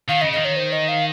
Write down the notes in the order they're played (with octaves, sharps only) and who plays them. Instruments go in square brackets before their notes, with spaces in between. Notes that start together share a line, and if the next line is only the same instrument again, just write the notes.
[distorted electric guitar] D#3 [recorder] F5
[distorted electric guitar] C#3 [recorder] D#5
[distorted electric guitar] D#3 [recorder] D#5
[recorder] C#5
C5
D#5
F5